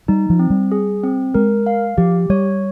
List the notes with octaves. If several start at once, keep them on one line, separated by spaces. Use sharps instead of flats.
G3 D#4
F3
C4
G3
G#4
C4
G#3 A#4
F5
F3 G4
G3 C#5